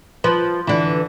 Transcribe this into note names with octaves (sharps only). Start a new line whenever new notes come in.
F3 B4
D3 E3